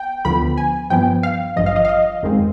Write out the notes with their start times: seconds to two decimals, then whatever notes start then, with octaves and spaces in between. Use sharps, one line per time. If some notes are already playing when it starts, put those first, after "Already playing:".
Already playing: B3 G5
0.25 D2 D3 F3 B3 B5
0.57 G#5
0.90 G2 F3 B3 G5
1.23 F5
1.56 G#1 G2 F3 D#5
1.66 F5
1.76 D#5
1.85 F5
1.89 D#5
2.22 G1 F2 D#3 G#3 C4